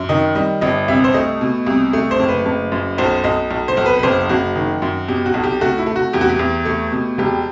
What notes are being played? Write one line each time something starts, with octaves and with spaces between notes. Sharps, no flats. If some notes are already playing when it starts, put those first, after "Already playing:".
Already playing: F#2
D#3 D#5
G3 D#5
G1 D#5
C2 E5
C5
A3 D#5
B2
C2
A3
C5
F#1
B4
F#1
F#2
B1 C5
B1 D#5
B1
C5
B1
B4
B4
F#1 C5
F#1 F#4
D#3
F#2
B2 G4
F#4
B1
G4
A3 F#4
E4
A3
F#4
E2 G4
F#4
G4
E2
A3
B2
E1 G4